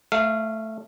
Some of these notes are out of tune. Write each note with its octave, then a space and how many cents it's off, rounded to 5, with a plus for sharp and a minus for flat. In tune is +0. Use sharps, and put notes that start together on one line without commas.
A3 +0 F5 -15